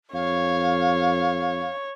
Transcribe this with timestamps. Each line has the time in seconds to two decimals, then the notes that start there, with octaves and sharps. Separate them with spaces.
0.14 F2 C#5 F5